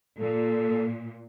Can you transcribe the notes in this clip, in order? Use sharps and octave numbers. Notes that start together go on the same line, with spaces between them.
A#2 A4